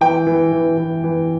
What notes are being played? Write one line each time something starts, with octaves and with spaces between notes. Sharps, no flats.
E3 G5
E3
E3
E3
E3